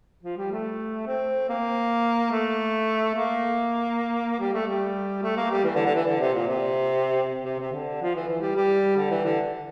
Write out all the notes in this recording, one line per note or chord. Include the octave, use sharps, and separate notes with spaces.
F3
G3
A3
C4
A#3
A3
A#3
G3
A3
G3
A3
A#3
G3
E3
D3
D3
E3
D3
C3
A#2
C3
C3
C3
D3
F3
E3
E3
G3
G3
D3
E3
D3